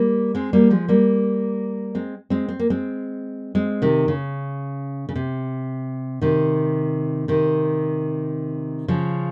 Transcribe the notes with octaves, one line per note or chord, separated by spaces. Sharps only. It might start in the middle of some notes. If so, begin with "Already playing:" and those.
Already playing: G3 A#3
G#3 C4
G3 A#3
F3 G#3
G3 A#3
G#3 C4
G#3 C4
C4
A#3
G#3 C4
G#3 C4
C3 D#3
C#3
C#3
C3
C3 D#3
C3 D#3
C#3 F3